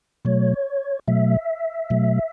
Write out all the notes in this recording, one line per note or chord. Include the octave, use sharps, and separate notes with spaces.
B2 F#3 A3 C#5
B2 F#3 A3 E5
B2 F#3 A3